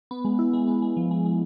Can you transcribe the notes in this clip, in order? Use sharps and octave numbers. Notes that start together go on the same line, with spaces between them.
B3
G#3
E4
G#3
B3
G#3
F3
G#3
G#3